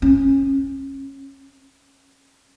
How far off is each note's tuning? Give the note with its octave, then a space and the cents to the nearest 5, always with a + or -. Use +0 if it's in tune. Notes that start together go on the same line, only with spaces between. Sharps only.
C#4 -25